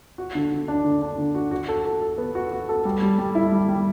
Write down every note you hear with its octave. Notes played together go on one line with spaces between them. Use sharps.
F#4
D3
D3
D4
D3
D4
D3
F#4
F#4
A4
A4
A4
B3
F#4
F#4
A4
G3
G3
G3
E4
G3
G3